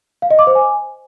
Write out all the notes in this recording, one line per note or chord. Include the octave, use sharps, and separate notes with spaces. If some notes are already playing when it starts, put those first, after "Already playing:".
F5
D#5
D6
C5
G#5